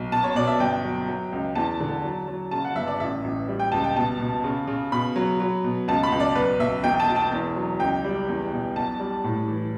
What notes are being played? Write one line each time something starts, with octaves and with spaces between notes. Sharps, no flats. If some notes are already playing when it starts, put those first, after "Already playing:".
Already playing: B1
B2 A5
C#5
B2 D5
E5
G1 G5
F#3
F#3
C#2
E2 A5
D3
F#3
F#3
C#3 A5
F#5
G1 E5
D5
A1 E5
A1
G3
G5
C#2 A5
G5
B2 A5
B2
C#3
C#3
B2 B5
F#3
F#3
B2
C#2 A5
B5
C#2
D5
B1 B4
B1 E5
E1 G5
A5
E1
A5
E2
F#3
C#2 G5
G3
E2
B2
B1 A5
G3
A2
E3